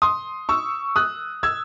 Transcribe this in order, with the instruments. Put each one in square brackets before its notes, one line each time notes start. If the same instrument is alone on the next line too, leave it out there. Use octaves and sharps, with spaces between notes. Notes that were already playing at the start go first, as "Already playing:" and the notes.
[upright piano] C6 D#6
C#6 E6
D#6 F#6
E6 G#6